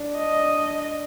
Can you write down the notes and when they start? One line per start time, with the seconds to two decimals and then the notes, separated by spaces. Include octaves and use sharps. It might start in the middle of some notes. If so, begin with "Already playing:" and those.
Already playing: D4 D5
0.18 D#5